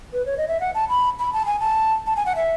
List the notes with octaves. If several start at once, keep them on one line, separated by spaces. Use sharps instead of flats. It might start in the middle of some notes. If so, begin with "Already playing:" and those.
B4
C#5
D#5
E5
F#5
A5
B5
B5
A5
G#5
A5
A5
G#5
F#5
E5